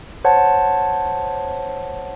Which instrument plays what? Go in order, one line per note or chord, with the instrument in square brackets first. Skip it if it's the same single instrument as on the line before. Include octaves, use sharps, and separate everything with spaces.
[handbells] C5 C#5 F#5 A5